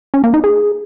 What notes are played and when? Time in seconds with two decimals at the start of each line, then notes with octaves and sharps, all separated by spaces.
0.14 C#4
0.24 A#3
0.34 D#4
0.44 G#4